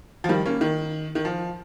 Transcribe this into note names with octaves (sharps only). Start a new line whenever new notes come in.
F3
D#3 G3
A#3 C#4
D#3
D#3
F3